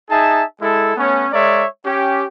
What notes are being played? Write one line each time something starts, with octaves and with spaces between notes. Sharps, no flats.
D#4 G#4 E5 A5
G#3 E4 A4
A3 B3 C#4
G#3 A#4 C#5 D5 E5
C#4 G4